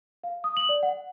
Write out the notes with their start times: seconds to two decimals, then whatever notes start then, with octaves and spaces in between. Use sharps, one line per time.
0.24 F5
0.44 D#6
0.57 F#7
0.69 D5
0.83 F#5